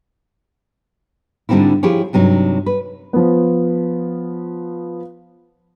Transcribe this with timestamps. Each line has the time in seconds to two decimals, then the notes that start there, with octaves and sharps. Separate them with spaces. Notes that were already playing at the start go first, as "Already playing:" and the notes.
1.49 G#2 D3 G3 C4 D#4 E4
1.83 F3 E4 G4 G#4 C#5
2.13 G2 C3 F#3 D#4
2.66 B4
3.13 F3 B3